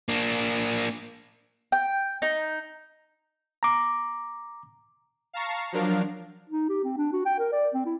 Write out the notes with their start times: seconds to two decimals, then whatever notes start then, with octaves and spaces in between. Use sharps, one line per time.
0.09 A#3 D4
1.72 G5
2.22 D#4
3.63 A#5 D6
5.33 F5 A5 A#5 C#6 C7
5.72 F3 F#3 D4 A#4 F5
6.50 D#4
6.69 G4
6.84 C4
6.98 D4
7.13 F#4
7.26 G5
7.39 A#4
7.53 D5
7.74 C4
7.86 E4